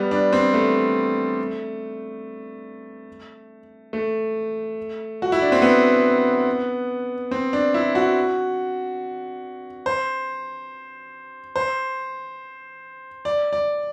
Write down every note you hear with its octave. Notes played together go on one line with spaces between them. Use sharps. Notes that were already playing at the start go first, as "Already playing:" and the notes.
Already playing: G3 B3
D4
C4
A3
A3
F#4
E4
D4
C4
B3
C4
D4
E4
F#4
C5
C5
D5
D5